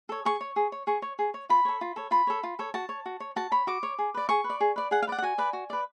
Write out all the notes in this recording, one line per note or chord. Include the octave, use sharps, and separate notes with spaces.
A4 C#5
G#4 C#6
C#5
G#4
C#5
G#4 C#6
C#5
G#4
C#5
F4 B5
A4 C#5
F4
A4 C#5
F4 B5
A4 C#5
F4
A4 C#5
F#4 A5
C#5
F#4
C#5
F#4 A5
C#5 B5
F#4 D6
C#5
G#4
B4 D5
G#4 C#6
B4
D5
G#4
B4 D5
G#4 F#5
F5
B4 D5 F#5
F#5
F#4 G#5
B4 D5
F#4
B4 D5